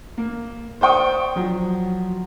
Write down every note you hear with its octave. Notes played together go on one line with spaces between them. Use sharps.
A#3
C5 D5 G5 C#6 D#6
F3 F#3